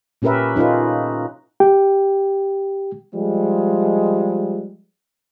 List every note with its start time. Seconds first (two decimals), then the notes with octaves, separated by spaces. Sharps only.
0.22 A#2 C#4 G4 A#4 B4 E5
0.56 C#4 D#4 F4 A4 B4
1.60 G4 G5
3.15 F3 G3 G#3